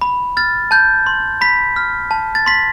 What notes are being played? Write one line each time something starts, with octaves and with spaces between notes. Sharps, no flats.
B5
F6 A6
A5 G6
C6
B5 B6
F6
A5
A6
C6 B6